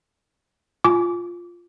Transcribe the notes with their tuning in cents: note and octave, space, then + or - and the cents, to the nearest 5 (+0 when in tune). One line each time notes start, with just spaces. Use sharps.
F4 +0 G#5 +20 D6 -25